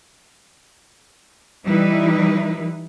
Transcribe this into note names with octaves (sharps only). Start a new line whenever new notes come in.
E3 G3 D#4 E4 B4